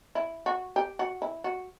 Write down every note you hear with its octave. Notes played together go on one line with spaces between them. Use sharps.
E4
F#4
G4
F#4
E4
F#4